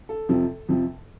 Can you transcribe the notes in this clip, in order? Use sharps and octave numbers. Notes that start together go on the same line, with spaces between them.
A4
F2 C3 F3
F2 C3 F3